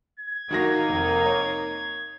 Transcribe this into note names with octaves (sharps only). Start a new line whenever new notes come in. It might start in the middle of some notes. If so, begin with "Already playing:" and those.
G#6
D#3 A#3 D#4 F#4 A#6
F1
C#5